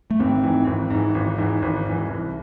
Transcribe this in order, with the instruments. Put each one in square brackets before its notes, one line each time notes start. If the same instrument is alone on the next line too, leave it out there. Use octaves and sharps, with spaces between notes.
[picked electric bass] A3
[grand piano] G#1 [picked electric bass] C4
[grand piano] G#2 E3
G#1
G#2 E3
G#1
G#2 E3
G#1
G#2 E3
C2